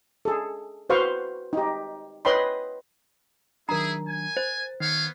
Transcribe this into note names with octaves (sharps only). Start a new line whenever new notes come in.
G#4 A4
F#4 B4 C5 F5 C#6
D#4 G4
B4 C#5 D#5 G5 B5 C6
D#3 F#3 D4 E4 G#4 A#4 A#5
G#5
C5 A6
D#3 B3 C#5 F5